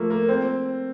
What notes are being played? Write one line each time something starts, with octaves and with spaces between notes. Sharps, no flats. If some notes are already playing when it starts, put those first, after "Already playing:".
Already playing: F3 A3 A#3
A#3
C4